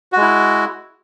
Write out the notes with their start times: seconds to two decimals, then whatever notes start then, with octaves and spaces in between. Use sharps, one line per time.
0.12 F#4
0.17 G#3
0.22 E4